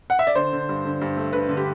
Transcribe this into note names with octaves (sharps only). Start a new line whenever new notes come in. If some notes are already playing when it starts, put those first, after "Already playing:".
F#5
E5
D5
D3 C5
D3
G2
D3
G2
A3
D3 B4
D3
G4